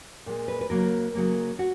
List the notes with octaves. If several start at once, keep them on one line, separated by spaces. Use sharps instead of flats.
A#2 G#3
B4
B4
C#3 F#3 A#3 A#4
C#3 F#3 A#3
F#4